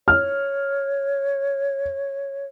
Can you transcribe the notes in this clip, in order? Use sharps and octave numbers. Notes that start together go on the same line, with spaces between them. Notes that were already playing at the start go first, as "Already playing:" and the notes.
C#5 F6